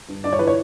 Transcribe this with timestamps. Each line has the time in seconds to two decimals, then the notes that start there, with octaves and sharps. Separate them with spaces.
0.08 G2
0.24 G2 D5
0.33 C#5
0.39 E3 B4
0.47 C#5